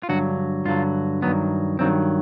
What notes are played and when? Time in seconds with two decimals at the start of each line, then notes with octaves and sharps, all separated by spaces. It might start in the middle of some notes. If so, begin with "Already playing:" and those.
0.03 F4
0.09 G2 D3 F#3 F#4
0.65 G2 D3 F#3 F4
1.22 G2 D#3 F#3 B3
1.79 G2 D#3 F#3 C4